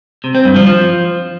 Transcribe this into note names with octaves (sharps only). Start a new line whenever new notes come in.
C3
C4
G2
F3
F3